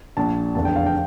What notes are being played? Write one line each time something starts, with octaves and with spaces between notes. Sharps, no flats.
A#1 A#2 A5
F1 E2 D3 A5
G5
F5
G5